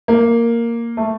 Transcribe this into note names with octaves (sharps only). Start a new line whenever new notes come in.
A#3
A3